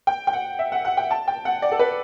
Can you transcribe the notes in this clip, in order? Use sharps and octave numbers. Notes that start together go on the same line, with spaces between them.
G5
G5
F#5
E5
F#5
F#5
G5
A5
G5
F#5
D5
A4
B4